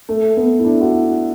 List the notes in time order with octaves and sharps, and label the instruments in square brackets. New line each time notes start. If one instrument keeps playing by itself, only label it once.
[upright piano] A3
B3
E4
D4
F#4
E4